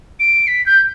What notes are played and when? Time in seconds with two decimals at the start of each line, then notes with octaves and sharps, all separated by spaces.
0.20 D7
0.47 B6
0.66 G6